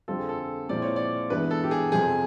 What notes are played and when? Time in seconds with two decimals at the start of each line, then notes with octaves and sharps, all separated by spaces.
0.08 F2 D3 G3 C4 F4 A4
0.19 G#4
0.29 A4
0.69 A#2 F3 G#3 C4 E4 D5
0.82 C#5
0.96 D5
1.30 G2 E3 G#3 B3 B4
1.51 A4
1.64 G4
1.71 G#4
1.92 F2 C3 F3 G#4